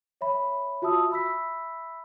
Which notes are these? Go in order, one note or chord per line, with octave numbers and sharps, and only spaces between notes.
C#5 E5 B5
F4 F#4 E5 A5 D#6 E6
E5 B5 E6 B6